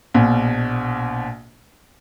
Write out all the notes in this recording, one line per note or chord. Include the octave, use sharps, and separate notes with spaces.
A#1 B2